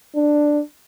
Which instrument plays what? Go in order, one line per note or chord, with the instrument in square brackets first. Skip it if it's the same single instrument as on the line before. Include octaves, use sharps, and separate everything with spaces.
[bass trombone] D4